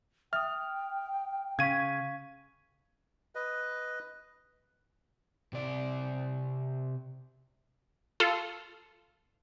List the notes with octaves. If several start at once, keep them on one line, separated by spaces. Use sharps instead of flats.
E5 G5 D#6 F6
C#3 F5 C#6 G#6 B6 D#7
B4 D#5
C3 D5
F4 A4